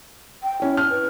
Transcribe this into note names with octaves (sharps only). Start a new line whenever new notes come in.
G5
C#4 E4
F6
B4